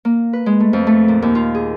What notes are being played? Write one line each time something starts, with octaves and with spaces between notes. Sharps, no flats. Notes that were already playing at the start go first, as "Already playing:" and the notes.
A#3
B4
G#3
A3
F2
A3
A#2
D#2
F4
G#4